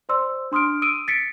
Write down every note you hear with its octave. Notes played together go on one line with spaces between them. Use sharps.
C5 D5 C6 E6
D4 C6 D#6 F6 D7
D#6 E6 D7 D#7
A6 B6 C#7 D7